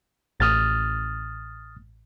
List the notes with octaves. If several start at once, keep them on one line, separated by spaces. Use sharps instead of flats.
A1 D#6 F6 A6